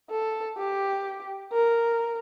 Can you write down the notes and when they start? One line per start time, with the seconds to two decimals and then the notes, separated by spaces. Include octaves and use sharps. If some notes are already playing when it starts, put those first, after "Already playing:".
0.10 A4
0.58 G4
1.52 A#4